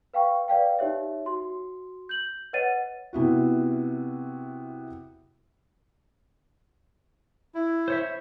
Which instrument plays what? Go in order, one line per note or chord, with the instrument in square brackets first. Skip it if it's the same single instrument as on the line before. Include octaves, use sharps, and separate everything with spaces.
[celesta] B4 F5 G5 C#6
B4 D5 F5 G5
D#4 G4 C#5 E5
F#4 C6
G6 F#7
B4 C#5 D#5 F#5 A6 D#7
[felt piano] C3 B3 E4 F#4
[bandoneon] E4
[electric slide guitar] C5 C#5 E5